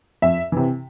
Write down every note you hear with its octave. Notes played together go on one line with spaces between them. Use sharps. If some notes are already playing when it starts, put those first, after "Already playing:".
F2 E5
C3 E3